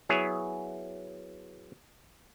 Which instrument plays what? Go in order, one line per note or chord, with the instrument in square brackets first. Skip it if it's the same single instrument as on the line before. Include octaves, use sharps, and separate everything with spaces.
[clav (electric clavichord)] F#3 B3 E4 G#4 C#5